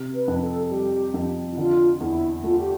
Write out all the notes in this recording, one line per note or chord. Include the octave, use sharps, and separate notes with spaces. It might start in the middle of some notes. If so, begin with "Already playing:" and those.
Already playing: C3
B4
F2
A4
G3 G4
F2
E4
D3 F4
E2 E4
A3 F4
G4